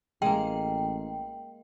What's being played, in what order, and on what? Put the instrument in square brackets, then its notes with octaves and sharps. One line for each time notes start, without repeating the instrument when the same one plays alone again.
[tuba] A1 [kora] G#3 A#3 [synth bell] G5